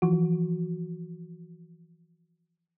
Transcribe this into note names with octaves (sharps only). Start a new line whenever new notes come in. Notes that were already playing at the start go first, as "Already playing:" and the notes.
E3 F3 F#4